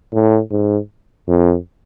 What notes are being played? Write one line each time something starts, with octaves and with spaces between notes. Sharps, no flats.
A2
G#2
F2